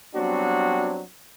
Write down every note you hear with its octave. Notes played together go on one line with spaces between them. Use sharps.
F#3 G3 B3 C4 D4 F#4